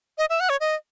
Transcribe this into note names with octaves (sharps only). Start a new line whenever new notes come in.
D#5
E5
F#5
C#5
D#5